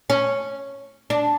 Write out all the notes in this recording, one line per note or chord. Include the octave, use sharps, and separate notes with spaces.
C#4
D4